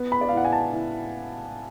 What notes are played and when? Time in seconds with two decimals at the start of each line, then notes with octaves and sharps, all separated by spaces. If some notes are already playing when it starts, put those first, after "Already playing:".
Already playing: B3
0.12 B5
0.21 D5
0.29 F5
0.32 A2 F#5
0.45 G#5
0.52 A5
0.73 A2